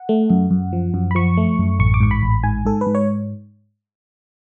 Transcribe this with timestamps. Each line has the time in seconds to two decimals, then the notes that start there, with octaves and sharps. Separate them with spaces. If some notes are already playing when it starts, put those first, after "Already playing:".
Already playing: F#5
0.09 A3
0.30 F#2
0.51 F#2
0.73 F3
0.94 F#2
1.11 B5
1.15 F3 C#6
1.37 A3
1.59 F#2
1.79 A1 C#6
1.94 D6
2.00 G#2 C#6
2.11 B5
2.23 A1
2.44 G#2 G#5
2.65 G#2 A4
2.81 B4
2.86 G#2
2.95 C#5